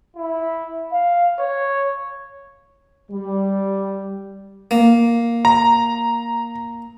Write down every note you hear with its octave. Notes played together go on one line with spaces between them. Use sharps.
E4
F5
C#5
G3
A#3
A#5